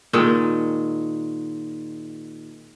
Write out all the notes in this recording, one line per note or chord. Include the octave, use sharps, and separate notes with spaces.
A#2 D#3 G#3 A4